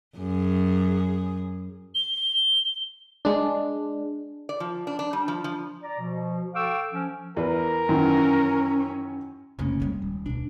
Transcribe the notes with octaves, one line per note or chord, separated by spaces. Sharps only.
F#2 G#4
G7
G#3 D4
D5
F3
D4
D4
G3
F3
F3
D5 A#5
B2 F3
A4 F5 G5 C#6 D6 E6
F3 C#4
E2 A#4 B4
F#2 D#3 E3 C#4
F1 F2 C#3 A#3 C#4
G3 G#3
D#1
D2 B2 D4